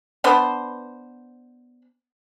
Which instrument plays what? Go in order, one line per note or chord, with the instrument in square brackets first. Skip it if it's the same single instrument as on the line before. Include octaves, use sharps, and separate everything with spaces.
[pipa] B3 D4 B4 C5